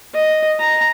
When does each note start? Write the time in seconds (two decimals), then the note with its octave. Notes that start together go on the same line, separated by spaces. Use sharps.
0.14 D#5
0.59 A#5